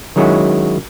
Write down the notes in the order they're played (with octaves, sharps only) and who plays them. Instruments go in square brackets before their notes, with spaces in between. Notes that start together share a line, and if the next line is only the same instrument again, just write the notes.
[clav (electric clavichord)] D#3 F#3 G#3 C#4 E4 F#4